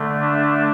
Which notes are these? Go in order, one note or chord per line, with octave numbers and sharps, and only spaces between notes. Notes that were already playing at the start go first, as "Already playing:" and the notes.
Already playing: D3 A3
D4